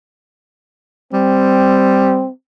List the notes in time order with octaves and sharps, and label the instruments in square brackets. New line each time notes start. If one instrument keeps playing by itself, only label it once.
[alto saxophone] G3 [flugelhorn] C4